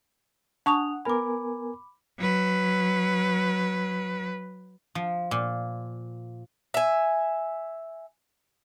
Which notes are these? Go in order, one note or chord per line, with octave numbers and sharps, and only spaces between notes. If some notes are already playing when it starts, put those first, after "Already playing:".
D4 F#5 A5 C#6 D#6 F7
B3 A#4 G#5 B5 D6
F#3 B4
F3
A#2
E5 G#5